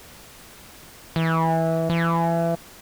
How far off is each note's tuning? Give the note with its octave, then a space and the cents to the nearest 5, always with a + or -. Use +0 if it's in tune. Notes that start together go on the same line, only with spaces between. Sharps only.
E3 -15
E3 +30